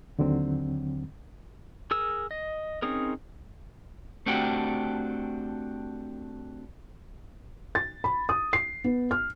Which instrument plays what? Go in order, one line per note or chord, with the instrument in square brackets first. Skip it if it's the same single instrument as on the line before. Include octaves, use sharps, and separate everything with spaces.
[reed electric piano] D#2 D3 F#3 C4
[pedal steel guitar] G#4 A#4 E6
D#5
C4 C#4 D#4 G#4 A#4
[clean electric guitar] A3 C4 D4 F#4 G4
[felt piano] A6
B5
D#6
C7
B3
F6